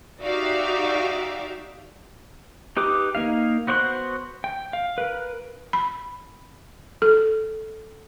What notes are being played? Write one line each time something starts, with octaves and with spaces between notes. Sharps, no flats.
D#4 F#4 G4 D5 E5 F5
D#4 G4 B4 D6 D#6
A#3 D#4 F5
B3 F#4 C5 C#6 F#6
G5
F5
A#4 B4
B5
A4